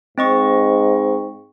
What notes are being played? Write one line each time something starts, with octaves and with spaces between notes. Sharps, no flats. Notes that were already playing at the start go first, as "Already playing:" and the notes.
G#2 C4 D#5 C#6